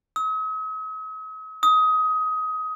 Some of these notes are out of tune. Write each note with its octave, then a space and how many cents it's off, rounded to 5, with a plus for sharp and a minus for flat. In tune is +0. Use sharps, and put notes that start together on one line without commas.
D#6 +45
D#6 +20